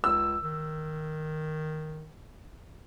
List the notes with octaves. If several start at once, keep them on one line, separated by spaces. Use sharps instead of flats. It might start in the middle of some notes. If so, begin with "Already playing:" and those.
C#2 E6
D#3